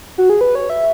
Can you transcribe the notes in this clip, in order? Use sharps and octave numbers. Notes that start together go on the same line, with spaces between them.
F#4
G#4
B4
C#5
E5